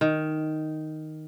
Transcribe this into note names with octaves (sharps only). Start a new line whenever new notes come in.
D#3